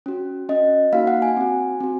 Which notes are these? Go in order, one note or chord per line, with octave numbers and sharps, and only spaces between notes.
C#4 F#4
C#4 F#4 D#5
A#3 D#4 F#4 F5
F#5
G#5
C4 F#4
C4 F#4